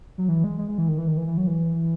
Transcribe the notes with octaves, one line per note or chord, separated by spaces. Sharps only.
F#3
E3
G#3
G#3
G#3
E3
D#3
E3
D#3
E3
E3
F#3
E3